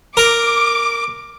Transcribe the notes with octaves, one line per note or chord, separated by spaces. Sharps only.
A#4 D6